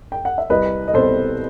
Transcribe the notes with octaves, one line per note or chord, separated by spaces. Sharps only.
G5
F#5
E5
C2 B4 D#5
D#5
B2 G3 C4 A4 C5